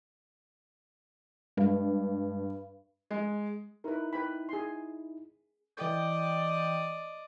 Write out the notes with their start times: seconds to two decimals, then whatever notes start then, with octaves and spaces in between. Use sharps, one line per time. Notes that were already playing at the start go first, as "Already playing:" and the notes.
1.57 G2 G#3
3.11 G#3
3.84 D#4 E4 A#4 B4
4.13 B4 G5 B5
4.49 G#4 C6
5.77 E3 D5 D#5 G5 G6